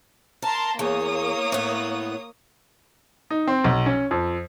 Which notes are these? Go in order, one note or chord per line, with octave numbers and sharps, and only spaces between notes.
A#4 A5 A#5 C6
E2 A#3 C#5 D#6
A2 B3
D#4
C4
B1
C#4
F2